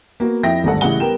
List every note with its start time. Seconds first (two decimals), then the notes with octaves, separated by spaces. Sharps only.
0.20 A#3 B3 F#4
0.43 F2 E4 E5 G5 A#6
0.64 G#1 D2 G2 A4 F#5
0.81 A1 C#3 G3 E4 F#5 G7
1.00 G3 B3 A#4 G5 E7